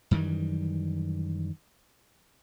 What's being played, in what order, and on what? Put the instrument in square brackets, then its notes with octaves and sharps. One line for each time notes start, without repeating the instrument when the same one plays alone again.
[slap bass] F#2 D#3 E3 G3